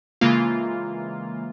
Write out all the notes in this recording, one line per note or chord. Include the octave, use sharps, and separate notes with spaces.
C#3 E3 G#3 A#3 F4